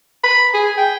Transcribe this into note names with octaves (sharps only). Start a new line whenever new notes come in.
B5
G#4
G5